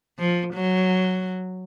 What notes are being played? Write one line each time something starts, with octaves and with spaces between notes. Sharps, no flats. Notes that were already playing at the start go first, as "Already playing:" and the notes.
F3
F#3